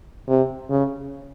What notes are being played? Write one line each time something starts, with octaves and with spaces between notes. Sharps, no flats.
C3
C#3